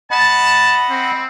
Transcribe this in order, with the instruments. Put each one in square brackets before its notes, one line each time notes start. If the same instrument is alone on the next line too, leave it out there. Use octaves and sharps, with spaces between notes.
[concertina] D#5 F#5 B5 [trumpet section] A5
[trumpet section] C4